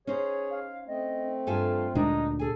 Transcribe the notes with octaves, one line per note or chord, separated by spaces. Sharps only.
C#4 D#4 G#4 C5 C#5
F5
A3 C4 D#5
G2 F4 A4 G#5
D2 A#2 G#3 D4 D#4
G#4 A4 G#5